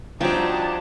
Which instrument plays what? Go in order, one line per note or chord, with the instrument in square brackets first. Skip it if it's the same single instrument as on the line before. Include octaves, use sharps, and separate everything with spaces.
[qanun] F3 F#4 [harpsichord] G3 C4 [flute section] D4 A5 G#6 [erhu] D#4